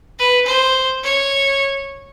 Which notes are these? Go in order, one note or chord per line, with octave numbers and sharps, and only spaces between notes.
B4
C5
C#5